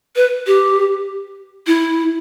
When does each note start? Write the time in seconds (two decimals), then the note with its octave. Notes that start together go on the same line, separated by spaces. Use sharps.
0.16 B4
0.47 G4
1.67 E4